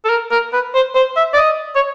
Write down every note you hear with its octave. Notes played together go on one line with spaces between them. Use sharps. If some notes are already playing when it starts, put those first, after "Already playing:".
A4
A#4
A#4
B4
C5
C5
E5
D5
D#5
C#5